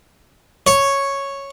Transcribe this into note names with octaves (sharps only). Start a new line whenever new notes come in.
C#5